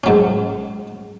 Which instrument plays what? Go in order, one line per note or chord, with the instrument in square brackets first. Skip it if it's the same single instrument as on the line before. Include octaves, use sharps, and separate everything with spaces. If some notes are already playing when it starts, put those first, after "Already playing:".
[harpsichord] G#2 F#3 C#4